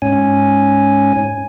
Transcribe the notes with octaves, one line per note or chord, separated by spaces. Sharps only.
G#2 C#4 G#5